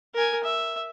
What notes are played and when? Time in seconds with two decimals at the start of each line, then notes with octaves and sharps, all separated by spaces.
0.14 A#4 G#5
0.44 E5